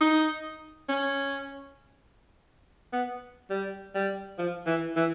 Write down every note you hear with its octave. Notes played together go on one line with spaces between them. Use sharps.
D#4
C#4
B3
G3
G3
F3
E3
E3